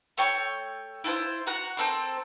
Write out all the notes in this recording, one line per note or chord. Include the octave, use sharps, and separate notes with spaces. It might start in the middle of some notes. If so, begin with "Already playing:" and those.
A3 C#5 G5 C#6
E4 F4 A4 C5
F#4 F#5 A#5
C4 A4 A#4 C6